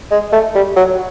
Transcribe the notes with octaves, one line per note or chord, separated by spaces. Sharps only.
G#3
A3
G3
F#3